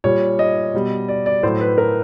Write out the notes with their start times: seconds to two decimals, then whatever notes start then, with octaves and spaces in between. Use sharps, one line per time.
0.04 A#2 G3 C#5
0.39 D#5
0.74 B2 G3
1.08 D5
1.26 D5
1.43 A2 F#3 A3 C5
1.61 B4
1.78 A#4